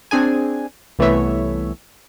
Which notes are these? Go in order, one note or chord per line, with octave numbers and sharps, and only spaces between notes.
C4 D4 G#4 G#5
C2 E3 A3 B3 C#5 E5